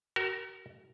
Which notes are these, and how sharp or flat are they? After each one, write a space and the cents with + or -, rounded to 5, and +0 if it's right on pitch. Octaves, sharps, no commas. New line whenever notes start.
F#4 +40 A#4 +0